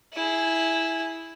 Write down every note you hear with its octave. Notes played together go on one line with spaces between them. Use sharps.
E4 G#4